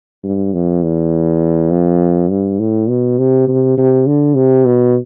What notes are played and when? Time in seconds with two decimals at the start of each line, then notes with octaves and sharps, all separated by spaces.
0.24 G2
0.54 F2
0.83 E2
1.71 F2
2.30 G2
2.60 A2
2.89 B2
3.19 C3
3.48 C3
3.78 C3
4.07 D3
4.36 C3
4.66 B2